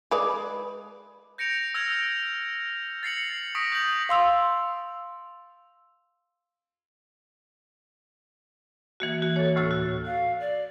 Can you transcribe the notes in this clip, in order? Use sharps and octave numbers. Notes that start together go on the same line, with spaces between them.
G#3 B4 D5
G6 A#6 C#7 D7 F7
E6 F6 G#6 F7
D7
A6 C7 C#7 F#7
C#6 D#6 A#6 B6 D7
G6 F#7
F5 C6 E6 F7
E3 A#3 F#4
F#4
A4 C#5
D2 A2 E6 A6
F#4
F5
D5